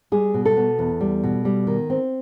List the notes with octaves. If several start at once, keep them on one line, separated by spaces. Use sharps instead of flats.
G3 G#4
B2
A4
B3
E2
G3
B2
G3
D#3
C4